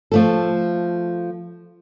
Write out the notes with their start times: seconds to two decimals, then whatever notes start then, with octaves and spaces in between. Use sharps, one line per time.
0.12 F3 A3 A4